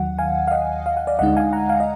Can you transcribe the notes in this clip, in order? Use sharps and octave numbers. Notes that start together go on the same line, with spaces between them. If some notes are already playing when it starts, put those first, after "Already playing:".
Already playing: D#2 D#3 F#3 F#5
F5 G#5
F5
D#5 F#5
F5
F#5
D5 F5
D2 D3 G#3 D#4 D#5 F#5
F5 G#5
F#5 A#5
F5 G#5
D#5